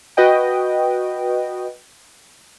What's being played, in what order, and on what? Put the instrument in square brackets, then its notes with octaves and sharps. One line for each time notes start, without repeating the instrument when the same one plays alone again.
[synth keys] F#4 B4 D#5 G5